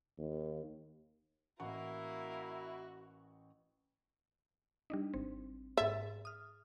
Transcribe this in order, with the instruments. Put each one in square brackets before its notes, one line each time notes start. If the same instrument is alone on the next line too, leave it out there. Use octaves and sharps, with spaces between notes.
[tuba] D#2
[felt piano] A1 F#5 C#6 [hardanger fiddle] A#3 A#4 [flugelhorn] E4 [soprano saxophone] F#4
[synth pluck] G3 D4 D#4
G#1 C4
[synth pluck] G#2 G#4 A6 [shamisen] E5
[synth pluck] D#6 F6